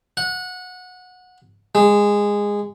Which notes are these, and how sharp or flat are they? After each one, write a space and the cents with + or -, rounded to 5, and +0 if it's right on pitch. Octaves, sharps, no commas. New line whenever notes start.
F#5 -20
G#3 -15